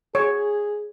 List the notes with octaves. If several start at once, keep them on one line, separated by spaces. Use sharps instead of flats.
G#4 C#5